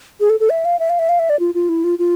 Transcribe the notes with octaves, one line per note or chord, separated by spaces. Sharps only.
G#4
A4
A4
E5
F5
E5
F5
E5
F5
E5
D5
F4
F4
E4
F4
F4